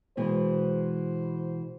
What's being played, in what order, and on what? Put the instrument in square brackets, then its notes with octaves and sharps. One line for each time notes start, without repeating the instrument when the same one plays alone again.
[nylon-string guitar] B2 E3 G#3 [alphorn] C5